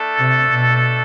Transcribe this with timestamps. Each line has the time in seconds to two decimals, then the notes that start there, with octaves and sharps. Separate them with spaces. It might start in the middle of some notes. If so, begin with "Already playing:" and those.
Already playing: A3 D4 A4
0.18 C3
0.51 B2